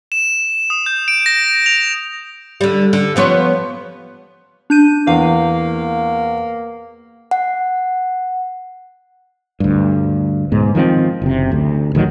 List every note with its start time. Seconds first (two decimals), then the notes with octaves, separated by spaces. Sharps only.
0.12 E7
0.70 D#6
0.86 G6
1.08 D7
1.26 A#6
1.66 F7
2.61 D3 G3
2.93 D3
3.16 F3 B3 C#5
4.70 D4 G6 D#7
5.07 E2 A#3 F5
7.31 F#5
9.60 D2 G2
10.52 G#2 B2
10.75 D#3 F3 F#3 C4
11.22 F#1 C3
11.52 D2
11.95 A1 D#3 F#3